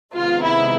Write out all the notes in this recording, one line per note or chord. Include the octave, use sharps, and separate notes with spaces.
C3 D#3 G#3 B3 D#4 F4
E4